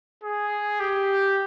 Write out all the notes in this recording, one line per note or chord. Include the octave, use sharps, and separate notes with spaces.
G#4
G4